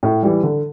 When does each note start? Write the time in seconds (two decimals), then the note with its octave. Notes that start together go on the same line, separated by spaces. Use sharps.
0.03 A2
0.23 E3 G3
0.43 D3